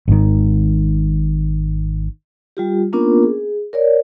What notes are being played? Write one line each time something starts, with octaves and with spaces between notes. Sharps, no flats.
G#1 G#2 D#3
G3 F4 G4
A#3 B3 C#4 D4 F4 A#4
G#4
A#4 C#5 D5